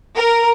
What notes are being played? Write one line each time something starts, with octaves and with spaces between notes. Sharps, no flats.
A#4